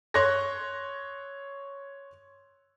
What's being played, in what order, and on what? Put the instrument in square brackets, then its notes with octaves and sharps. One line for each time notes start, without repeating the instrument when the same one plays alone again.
[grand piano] C#5 C6 C#6 F#6 G#6 A#6